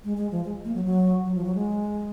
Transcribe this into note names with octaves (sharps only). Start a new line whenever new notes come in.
G#3
G#3
F3
G#3
A#3
F#3
F#3
F#3
F3
F#3
G#3